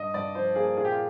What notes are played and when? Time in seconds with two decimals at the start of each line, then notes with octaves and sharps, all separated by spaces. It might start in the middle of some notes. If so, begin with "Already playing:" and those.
Already playing: G2 D#5
0.14 G2 D5
0.35 F3 C5
0.55 A#3 G#4
0.77 A#2 G#4
0.85 G4
0.92 F4